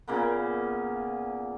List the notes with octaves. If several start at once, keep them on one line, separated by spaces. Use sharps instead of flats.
A#2 C#3 A#3 B3